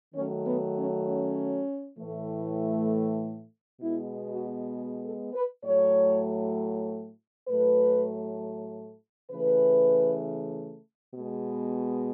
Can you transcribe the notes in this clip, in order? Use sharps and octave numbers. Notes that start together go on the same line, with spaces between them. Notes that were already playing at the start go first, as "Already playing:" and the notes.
D#3 F#3 A3 C#4
B3
C#4
C#4
A2 E3 A3
B2 G#3 B3 E4
F#4
G#4
A4
B4
A2 F#3 A3 C#5
A2 F#3 A3 B4
C#3 E3 A3 B4
B2 G#3 B3